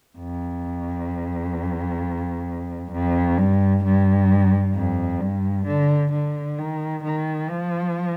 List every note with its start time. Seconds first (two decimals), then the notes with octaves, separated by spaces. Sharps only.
0.19 F2
2.92 F2
3.38 G2
3.84 G2
4.74 F2
5.20 G2
5.66 D3
6.12 D3
6.58 D#3
7.03 D#3
7.49 F3